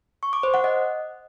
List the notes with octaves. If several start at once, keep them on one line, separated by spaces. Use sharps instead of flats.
C#6
D6
C5
F#5
D#5